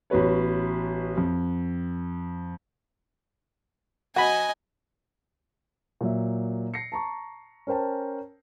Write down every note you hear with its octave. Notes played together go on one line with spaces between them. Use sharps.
A1 B3 F#4 B4 C#5
F2
F#4 D#5 G#5 B5
A#2 F#3 E5
A#6 C7 C#7
A5 A#5 C#6
C#4 A#4 C5 G5 A5